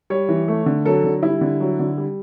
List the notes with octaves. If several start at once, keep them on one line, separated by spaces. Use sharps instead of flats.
G3 C#5
E3
A3
D3
F#3 A4
D3
G3 E4
D3
F#3
D3
G3